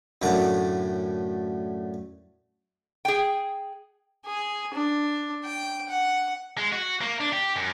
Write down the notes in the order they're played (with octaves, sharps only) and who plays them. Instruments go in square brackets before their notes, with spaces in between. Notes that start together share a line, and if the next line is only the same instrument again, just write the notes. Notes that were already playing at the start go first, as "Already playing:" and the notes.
[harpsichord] F#2 A2 D3 A3 D5
[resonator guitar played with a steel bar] G#4 G5
[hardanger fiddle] G#4
D4
G5
F#5
[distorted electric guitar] G#3
F#4
A#3
D4
G4
F#2